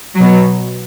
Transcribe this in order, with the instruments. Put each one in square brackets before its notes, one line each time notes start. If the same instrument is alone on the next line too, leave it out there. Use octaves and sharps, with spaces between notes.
[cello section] B2 F#3